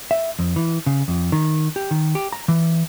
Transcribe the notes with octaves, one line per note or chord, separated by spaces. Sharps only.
E5
F2
E3
C#3
F2
D#3
G4
D#3
G4
A#5
E3